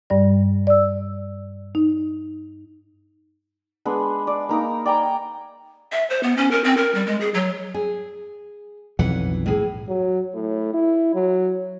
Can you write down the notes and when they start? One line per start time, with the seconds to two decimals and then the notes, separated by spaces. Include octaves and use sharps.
0.10 G2 G3 D5
0.67 D5 E6
1.75 D#4
3.86 G#3 B3 D4
4.27 D5
4.49 A#3 D#4 A#4
4.86 D5 G5 G#5 A#5
5.92 E5
6.10 C5
6.23 B3
6.37 C#4
6.51 A#4
6.64 C4
6.77 A#4
6.95 G3
7.06 G#3
7.21 G#4
7.34 F#3
7.74 G#4
8.99 B1 F2 E3 F#5
9.46 A2 G#4
9.89 F#3
10.34 A2
10.74 E4
11.14 F#3